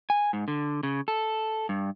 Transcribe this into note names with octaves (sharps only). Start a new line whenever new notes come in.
G#5
G#2
D3
C#3
A4
G2